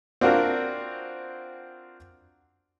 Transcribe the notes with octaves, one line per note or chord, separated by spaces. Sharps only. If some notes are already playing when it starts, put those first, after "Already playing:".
C4 D4 F4 F#4 A#4